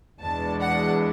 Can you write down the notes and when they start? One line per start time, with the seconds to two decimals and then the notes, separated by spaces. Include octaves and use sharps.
0.21 E2 B2 G#3 D4 A5
0.61 F#5